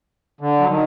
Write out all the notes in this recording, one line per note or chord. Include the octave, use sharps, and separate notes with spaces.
D3
F#3
D#3